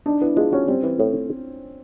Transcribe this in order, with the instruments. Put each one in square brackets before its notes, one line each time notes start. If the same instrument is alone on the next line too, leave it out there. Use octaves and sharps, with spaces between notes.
[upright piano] D4 [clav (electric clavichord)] D#4
[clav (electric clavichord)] B3 [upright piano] E4
[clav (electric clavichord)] G#3 [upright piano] F4
[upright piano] C#4 [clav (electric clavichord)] F#4
[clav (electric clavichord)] G3 [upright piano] C4
[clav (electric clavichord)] E3
A2